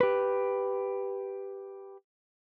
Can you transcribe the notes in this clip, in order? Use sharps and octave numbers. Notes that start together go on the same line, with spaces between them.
G4 B4